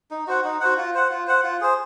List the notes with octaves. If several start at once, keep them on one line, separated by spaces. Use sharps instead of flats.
D#4
F#4 C5 F#5
D#4
F#4 C5 F#5
F4
C5 F#5
F4
C5 F#5
F4
G#4 C5